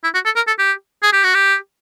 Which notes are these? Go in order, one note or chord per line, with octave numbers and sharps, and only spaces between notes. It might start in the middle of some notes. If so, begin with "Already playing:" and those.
E4
F#4
A4
A#4
A4
G4
G#4
G4
F#4
G4